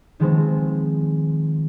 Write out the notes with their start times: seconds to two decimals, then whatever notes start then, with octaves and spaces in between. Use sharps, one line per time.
0.20 D#3 F3 G#3 B3 C4